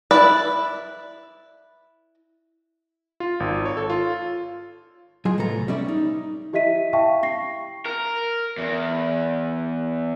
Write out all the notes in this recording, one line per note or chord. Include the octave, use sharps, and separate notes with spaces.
E4 B4 D5
F4
G#1
C#5
A4
F4
F#3 G#3 F4 G#5
C2 A2 B3 A4 A#5
G3 B3 C#4 D5 E5
D#4
E4 G4 D#5 E5 B6 D#7
E5 F5 G5 A5 C#6
C#6 A#6 C7
A#4
E2